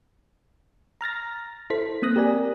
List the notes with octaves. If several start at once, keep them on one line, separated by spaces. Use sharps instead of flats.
A#5 F6 A6 A#6
E4 A4 C5 B6
A#3 C4 D#6 F#6 A#6
G4 A#4 D5 G#5